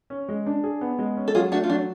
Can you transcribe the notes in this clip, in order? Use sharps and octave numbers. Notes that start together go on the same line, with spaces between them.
C#4
G#3
D4
G#4
B3
G#3
C#4
A4
F#3 F4 G#4
A3 D4 F#4
F4
F#3 D4